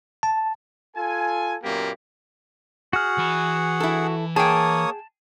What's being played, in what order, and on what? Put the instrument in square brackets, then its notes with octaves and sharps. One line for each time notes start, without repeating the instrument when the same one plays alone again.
[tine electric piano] A5
[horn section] F4 A4 G#5
F#2 A#2 A#3 B3 G4
[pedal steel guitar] F#4 F6 [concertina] G#4 F#5
[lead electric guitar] E3 B5
[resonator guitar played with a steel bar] E4 A4
[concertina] A#3 C#5 D#6 [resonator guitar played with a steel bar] G#4 G5 [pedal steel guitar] A5